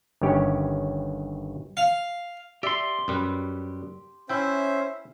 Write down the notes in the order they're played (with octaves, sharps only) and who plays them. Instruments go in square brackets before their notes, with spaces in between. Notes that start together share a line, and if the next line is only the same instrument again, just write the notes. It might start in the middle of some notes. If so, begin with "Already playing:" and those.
[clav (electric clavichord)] G1 G2 D#3 C#4 G4 C#5
[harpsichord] F5
[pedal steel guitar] G4 C6 [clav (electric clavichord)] D5 E5
[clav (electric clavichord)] F#2 G3 B4
[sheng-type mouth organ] C#4 C5 E5 [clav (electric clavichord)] E4 G5